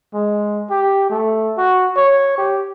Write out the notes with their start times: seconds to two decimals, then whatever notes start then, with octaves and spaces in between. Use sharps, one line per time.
0.14 G#3
0.70 G4
1.10 A3
1.57 F#4
1.96 C#5
2.38 G4